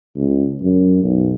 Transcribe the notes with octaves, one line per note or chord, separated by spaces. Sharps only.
C#2
F#2
B1